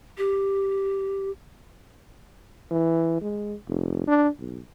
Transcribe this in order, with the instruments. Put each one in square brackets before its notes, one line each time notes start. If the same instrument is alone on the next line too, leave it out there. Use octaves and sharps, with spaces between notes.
[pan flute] G4
[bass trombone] E3
G#3
F1
D4
B1